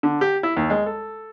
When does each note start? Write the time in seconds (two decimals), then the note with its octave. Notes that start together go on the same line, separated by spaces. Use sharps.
0.03 D3
0.21 G4
0.43 E4
0.57 D#2
0.70 G#3
0.86 A4